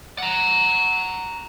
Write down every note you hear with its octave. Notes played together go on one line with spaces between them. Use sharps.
F#5 A#5